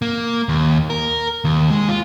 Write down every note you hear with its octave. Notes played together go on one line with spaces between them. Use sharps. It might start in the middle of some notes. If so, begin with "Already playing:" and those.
A#3
D#2
A#4
D#2
G#3
F4